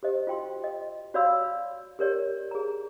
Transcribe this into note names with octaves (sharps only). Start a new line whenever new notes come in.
G4 C5 D#5
F4 F#4 G5 C6
D#5
F#4 C#5 D5 F5 B5 E6
G4 A#4 C#5 D5
G#4 A#5